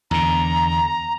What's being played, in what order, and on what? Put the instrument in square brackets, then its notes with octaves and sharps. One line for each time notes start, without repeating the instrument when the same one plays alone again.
[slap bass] E2 D3 [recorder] A#5